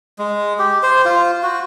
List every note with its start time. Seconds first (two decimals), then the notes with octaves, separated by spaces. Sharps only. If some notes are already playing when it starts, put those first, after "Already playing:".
0.19 G#3
0.59 G4
0.83 C5
1.05 F4
1.43 F#4